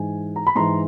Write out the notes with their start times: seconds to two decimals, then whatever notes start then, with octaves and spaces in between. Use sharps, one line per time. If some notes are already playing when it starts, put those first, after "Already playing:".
Already playing: G#2 E3 G#5
0.36 A#5
0.47 B5
0.55 G#2 E3 A#5 C6